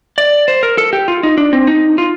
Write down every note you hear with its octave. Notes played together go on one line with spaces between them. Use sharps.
D5
C5
A#4
A4
G4
F4
D#4
D4
C4
D#4
F4